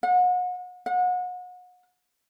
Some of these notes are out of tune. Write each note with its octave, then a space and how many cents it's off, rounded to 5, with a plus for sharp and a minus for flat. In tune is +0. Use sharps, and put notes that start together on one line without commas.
F#5 -35
F#5 -35